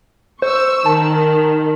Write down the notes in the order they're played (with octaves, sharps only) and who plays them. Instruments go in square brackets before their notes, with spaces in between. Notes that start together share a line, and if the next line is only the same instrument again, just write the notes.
[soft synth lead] C5 [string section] C#6 E6
[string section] D#3 [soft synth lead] A5